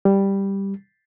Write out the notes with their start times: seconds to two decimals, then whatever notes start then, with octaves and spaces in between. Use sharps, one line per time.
0.05 G3